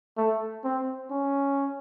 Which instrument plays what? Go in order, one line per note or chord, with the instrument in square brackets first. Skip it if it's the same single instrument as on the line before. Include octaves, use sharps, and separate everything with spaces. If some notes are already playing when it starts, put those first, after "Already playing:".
[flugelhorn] A3
C4
C#4